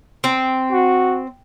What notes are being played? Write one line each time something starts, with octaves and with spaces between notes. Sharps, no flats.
C4
F#4